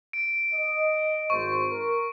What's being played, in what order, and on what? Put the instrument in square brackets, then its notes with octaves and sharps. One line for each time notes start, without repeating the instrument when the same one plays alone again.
[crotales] D7
[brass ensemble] D#5
[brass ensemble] G#1 C5 [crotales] C#6
[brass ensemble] A#4